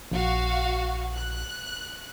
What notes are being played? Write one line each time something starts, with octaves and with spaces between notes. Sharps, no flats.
A#1 F#4 F5 F#5
F#6